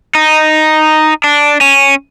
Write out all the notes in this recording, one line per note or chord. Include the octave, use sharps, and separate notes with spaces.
D#4
D4
C#4